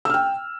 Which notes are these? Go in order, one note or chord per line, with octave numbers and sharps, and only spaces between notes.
G5 E6 F6